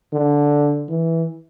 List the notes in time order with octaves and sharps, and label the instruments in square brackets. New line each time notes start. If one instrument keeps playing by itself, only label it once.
[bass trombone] D3
E3